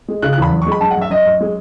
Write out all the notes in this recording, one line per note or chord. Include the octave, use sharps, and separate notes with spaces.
G#3
C#3 F#6
F#6
E2 B5
F#2
C#6
G#3
B5
F#2 A5
F#5
F#2
E5
F#2 D#5
F#2
G#3